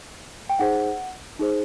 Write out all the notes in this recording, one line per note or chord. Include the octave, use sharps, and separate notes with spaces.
G5
D#4 G#4 C5 F#5
D#4 G#4 C5